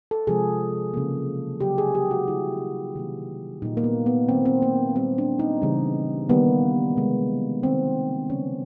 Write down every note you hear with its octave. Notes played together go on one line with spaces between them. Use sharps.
A4
C3 F3 G#3 G#4
C#3 F#3 A#3
C#3 F#3 A#3 G4
G#4
G4
F#4
D3 G3 A#3 E4
C3 D#3 F#3 A#3
A#2 G3 A#3 D#4
A#3
B3
B3
D#3 F#3 A3 C4
C4
A#3
A#2 G3 A#3 C4
D4
D#4
C#3 E3 G3
D#3 G3 A#3 B3
C3 F3 G#3
D#3 G#3 C4
C#3 F#3 A3 C#4